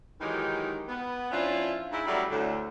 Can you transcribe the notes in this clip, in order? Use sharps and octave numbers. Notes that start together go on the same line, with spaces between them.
D#3 E3 F#3 G#3 D#4 G4
B3
F3 C#4 D4 E4 F4
G#2 E4
F#3 G3 A3 C#4 E4 D5
D2 A2 D3